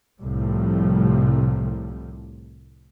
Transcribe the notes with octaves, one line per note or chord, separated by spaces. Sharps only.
C2 A2 C3 F3 G3